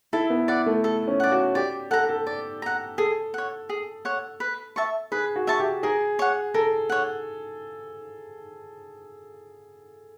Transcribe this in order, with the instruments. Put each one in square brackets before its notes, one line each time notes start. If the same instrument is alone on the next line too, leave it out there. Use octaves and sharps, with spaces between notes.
[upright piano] E4 [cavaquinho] A4
[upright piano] B3
[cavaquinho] D5 F#5
[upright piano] A3
[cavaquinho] A4
[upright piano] C#4
[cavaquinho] D5 F#5
[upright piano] F#4
[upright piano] G4 [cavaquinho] D5
[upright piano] A4 [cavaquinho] F#5 A#5
[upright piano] A4
[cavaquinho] D5
F#5 A#5
[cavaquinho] G#4 [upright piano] A4
[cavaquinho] C#5 F#5
G#4
C#5 F#5
B4
E5 A5 C#6
[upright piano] G#4 [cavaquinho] B4
[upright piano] F#4
[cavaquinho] E5 A5 C#6
[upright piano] G4
[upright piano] G#4 [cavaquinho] A#4
[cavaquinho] C#5 F#5
[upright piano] A4 [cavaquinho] A#4
[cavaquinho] C#5 F#5